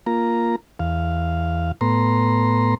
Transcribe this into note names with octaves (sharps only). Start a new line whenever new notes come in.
A#3 F4 A#5
E2 F5
A2 B3 A#5 C6